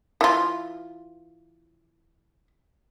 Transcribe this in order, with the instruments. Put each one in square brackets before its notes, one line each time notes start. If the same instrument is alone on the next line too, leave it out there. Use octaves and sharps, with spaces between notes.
[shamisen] E3 F4